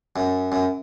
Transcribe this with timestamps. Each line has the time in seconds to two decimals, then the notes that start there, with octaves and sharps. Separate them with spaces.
0.16 F#2
0.52 F#2